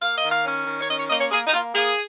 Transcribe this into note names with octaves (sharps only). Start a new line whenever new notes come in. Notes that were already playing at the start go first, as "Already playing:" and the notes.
A#3 F5
D#5
D#3
F5
C#4
D#3
C#5
C#4 D#5
C#5
A#3 D#5
C#5
A#3 G#4
D#4
A#3 F4
A#3 G#4